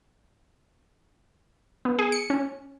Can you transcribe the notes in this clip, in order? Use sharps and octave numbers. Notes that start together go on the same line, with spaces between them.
B3
G#4
C#7
C#4